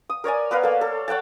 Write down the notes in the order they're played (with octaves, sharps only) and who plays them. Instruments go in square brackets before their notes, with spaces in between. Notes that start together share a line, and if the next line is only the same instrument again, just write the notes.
[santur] D#6
A#4 C#5 D5 G#5
B3 A#4 B4 F5
A#3 A4
A4
C#5 F#5 G5 A5